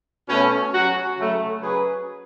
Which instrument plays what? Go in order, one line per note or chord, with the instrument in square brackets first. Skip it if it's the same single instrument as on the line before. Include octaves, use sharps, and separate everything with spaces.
[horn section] B2 A3 C#4
F#3 C#4 F#4
C#3 F#3 A3
F#3 C#4 G#4 B4